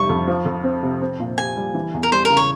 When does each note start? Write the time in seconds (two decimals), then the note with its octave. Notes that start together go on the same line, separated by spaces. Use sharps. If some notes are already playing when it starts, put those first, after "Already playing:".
Already playing: F1 C3 G3 C#6
0.09 F2
0.28 F3
0.45 F2
0.64 C4
0.83 C3
1.01 C4
1.20 A#2
1.38 G4 G#5
1.57 G3
1.75 E3
1.94 E2
2.03 A#4
2.12 G3 C5
2.25 A#4
2.30 C#3
2.37 C#5